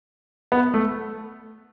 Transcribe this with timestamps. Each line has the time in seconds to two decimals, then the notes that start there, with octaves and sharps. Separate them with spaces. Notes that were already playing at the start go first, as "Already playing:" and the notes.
0.52 B3
0.74 A3